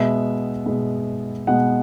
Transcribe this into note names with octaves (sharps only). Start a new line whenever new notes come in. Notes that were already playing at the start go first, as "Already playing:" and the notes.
Already playing: B2 G#3 B3 E5
B2 G#3 B3
B2 G#3 B3 F#5